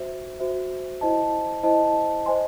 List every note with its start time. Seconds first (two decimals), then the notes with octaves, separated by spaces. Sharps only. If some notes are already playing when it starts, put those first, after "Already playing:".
Already playing: F#4 C5 E5
0.40 F#4 C5 E5
1.01 E4 C5 D#5 A5
1.63 E4 C5 D#5 A5
2.26 C5 D#5 G#5 C6